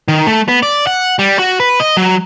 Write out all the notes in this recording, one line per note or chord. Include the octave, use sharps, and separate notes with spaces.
D#3
A3
B3
D5
F#5
G3
F#4
B4
D#5
F#3